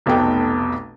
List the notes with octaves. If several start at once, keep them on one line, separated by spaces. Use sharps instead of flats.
F1 B1 B2 A3 G5